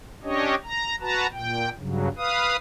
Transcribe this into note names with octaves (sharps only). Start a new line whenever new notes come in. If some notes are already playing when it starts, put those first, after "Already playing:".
C#4 D4 G4 C#5 D#5
A#5
F#4 B4 A5 A#5
A#2 G5
G2 C#3 F#3
B4 F5 D#6